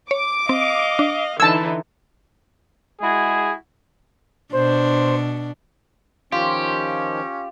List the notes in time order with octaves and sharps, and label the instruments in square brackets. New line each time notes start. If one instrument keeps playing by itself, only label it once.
[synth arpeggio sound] C#5 [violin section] D6
[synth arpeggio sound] C4 [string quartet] D#5 F5
[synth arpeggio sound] D4
[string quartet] D3 E3 [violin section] D#4 E4 [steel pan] A5 E6 [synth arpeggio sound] G#6
[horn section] G#3 E4 F#4 G#4
[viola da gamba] B2 D4 [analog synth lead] C5
[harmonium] D#3 F3 [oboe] C#4 [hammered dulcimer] F4 [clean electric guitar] G4